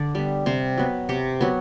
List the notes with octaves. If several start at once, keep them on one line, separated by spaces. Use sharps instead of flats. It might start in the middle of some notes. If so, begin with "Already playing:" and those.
Already playing: D3 D5
G3 B3
C3 C5
F#3 B3
C3 G4
F#3 B3